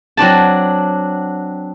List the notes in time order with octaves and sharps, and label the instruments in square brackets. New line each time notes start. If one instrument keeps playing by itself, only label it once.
[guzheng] F#3 C4 D4 A5